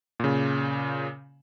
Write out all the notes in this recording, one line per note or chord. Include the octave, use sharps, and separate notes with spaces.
A#2 C#3